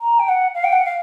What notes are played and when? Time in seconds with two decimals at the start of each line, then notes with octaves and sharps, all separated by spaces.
0.01 A#5
0.19 G5
0.28 F#5
0.55 F5
0.64 G5
0.72 F#5
0.85 F5